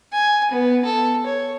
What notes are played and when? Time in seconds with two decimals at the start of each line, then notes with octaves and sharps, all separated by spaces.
0.13 G#5
0.51 B3
0.85 A4
1.26 C#5